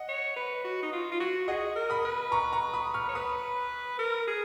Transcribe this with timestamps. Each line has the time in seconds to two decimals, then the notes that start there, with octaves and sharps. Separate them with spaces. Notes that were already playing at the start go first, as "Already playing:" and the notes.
Already playing: D#5 F#5
0.08 C#5
0.36 B4
0.64 F#4
0.82 D#4
0.93 F4
1.12 F4
1.20 F#4
1.48 G#4 D#5 F#5
1.75 A#4
1.90 B5 D#6
2.04 B4
2.32 A#5 C#6
2.52 A#5 C#6
2.73 B5 D#6
2.94 C#6 F6
3.09 C#5
3.15 B4 B5 D#6
3.99 A#4
4.27 G#4